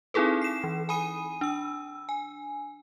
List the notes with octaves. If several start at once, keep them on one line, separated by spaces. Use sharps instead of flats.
C4 D#4 E4 G#4 A4 B4
C7 E7
E3
G#5 B5 D#6 D#7
D4 E6
G#5